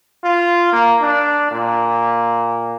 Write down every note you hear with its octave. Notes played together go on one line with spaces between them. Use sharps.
F4
A#3
D4
A#2